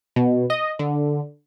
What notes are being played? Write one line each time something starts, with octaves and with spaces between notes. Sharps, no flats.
B2
D#5
D3